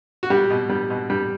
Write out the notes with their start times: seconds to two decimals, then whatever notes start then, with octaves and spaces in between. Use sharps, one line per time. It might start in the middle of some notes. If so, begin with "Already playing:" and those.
0.23 F#4
0.30 G3 G4
0.50 B2
0.69 G3
0.90 B2
1.10 G3